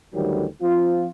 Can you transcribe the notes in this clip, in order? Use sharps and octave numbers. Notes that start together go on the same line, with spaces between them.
D2 D#3 E3 F#3 G3
F3 C4 F4